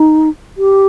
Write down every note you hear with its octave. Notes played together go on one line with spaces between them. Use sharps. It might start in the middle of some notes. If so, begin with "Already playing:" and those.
Already playing: D#4
G4